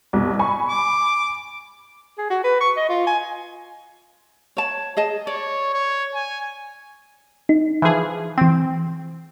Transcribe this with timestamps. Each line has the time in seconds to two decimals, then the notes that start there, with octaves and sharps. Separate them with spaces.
0.13 C2 B2
0.39 G#5 B5 C#6
0.69 D6
2.18 G#4
2.31 F#4
2.44 B4
2.61 C#6
2.77 D#5
2.89 F4
3.07 G#5
4.57 C#5 A5
4.97 G#4 D#5 A5
5.27 C#5 D5
5.73 C#5
6.14 G#5
7.49 D#4
7.82 E3 F3 G#4
8.38 E3 C4 G5